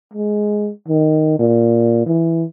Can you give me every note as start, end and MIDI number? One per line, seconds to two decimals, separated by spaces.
0.13 0.69 56
0.88 1.37 51
1.39 2.05 46
2.06 2.44 52